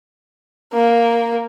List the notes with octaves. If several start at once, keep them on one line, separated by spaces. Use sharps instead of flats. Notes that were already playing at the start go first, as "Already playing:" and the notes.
A#3